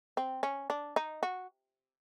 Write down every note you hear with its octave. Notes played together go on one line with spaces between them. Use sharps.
C4
C#4
D4
D#4
F#4